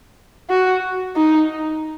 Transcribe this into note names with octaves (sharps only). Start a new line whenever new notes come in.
F#4
D#4